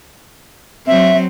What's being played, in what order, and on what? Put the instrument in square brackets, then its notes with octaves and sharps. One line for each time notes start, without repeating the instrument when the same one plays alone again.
[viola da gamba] F#3 C4 [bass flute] E5